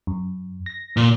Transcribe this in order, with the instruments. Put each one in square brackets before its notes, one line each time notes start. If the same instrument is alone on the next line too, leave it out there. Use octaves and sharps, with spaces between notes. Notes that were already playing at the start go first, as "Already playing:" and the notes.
[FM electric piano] F#2
A#6
[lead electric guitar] A#2